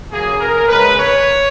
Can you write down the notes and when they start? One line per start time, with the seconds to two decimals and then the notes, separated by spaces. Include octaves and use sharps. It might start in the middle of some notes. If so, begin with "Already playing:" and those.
0.12 C#3 F#3 A#3 G#4
0.41 A#4
0.68 C#3 G#3 C#4 B4
0.97 C#5